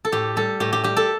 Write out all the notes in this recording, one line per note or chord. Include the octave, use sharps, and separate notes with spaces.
A4
A2 G4
G3 A4
A2 G4
G4
G3 G4
A4